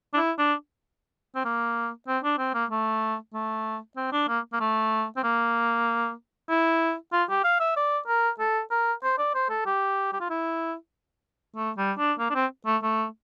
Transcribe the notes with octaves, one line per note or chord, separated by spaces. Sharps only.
D4
E4
D4
C4
A#3
C4
D4
C4
A#3
A3
A3
C4
D4
A#3
A#3
A3
C4
A#3
E4
F4
G4
F5
E5
D5
A#4
A4
A#4
C5
D5
C5
A4
G4
G4
F4
E4
A3
G3
D4
A#3
D4
C4
A3
A3